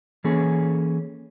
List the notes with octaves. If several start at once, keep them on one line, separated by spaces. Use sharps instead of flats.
E3 A#3 C#4 G#4 A4 C#5